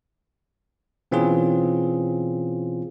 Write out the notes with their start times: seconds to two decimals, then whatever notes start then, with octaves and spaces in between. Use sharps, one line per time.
1.11 B2 E3 C4 C#4 F4 G#4